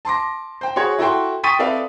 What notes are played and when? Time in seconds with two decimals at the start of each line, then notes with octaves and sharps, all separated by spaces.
0.05 A5 C6 D6 A#6
0.61 C5 G5
0.76 F#4 G#4 C#5
0.98 E4 F#4 A4 G5 C6
1.43 G5 C#6 D#6 A6 B6 D#7
1.59 C4 A4 B4 D5 E5 F5